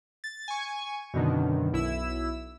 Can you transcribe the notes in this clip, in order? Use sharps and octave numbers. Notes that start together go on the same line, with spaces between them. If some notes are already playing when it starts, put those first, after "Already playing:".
A6
G#5 C#6
F#2 B2 D3 D#3
B1 E4 E6